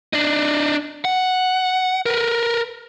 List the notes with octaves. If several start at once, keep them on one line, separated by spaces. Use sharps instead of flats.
D4 D#4
F#5
A#4 B4